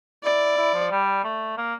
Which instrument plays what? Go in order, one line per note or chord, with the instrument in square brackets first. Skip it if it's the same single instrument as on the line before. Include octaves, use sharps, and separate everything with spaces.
[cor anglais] E4 [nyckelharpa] D5
[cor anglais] E4
F3
G3
A3
A#3